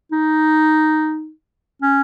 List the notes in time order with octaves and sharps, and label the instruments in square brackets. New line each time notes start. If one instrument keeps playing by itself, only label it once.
[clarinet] D#4
C#4